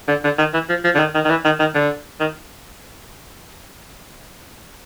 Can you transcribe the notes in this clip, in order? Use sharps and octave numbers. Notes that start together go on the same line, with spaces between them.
D3
D3
D#3
E3
F3
F3
D3
D#3
D#3
D#3
E3
D#3
D#3
D3
D#3